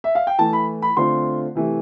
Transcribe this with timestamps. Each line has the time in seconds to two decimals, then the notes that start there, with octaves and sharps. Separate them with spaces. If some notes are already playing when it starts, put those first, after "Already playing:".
0.04 E5
0.15 F5
0.27 G5
0.39 E3 A3 E4 A5
0.53 B5
0.82 B5
0.97 D3 A3 C4 F4 C6
1.55 C3 E3 A3